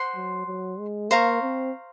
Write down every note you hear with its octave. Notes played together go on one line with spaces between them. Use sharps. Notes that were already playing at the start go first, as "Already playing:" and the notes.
Already playing: C5 F#5 C6
F#3
F#3
G#3
A#3 C5 F5 A#5 C#6
C4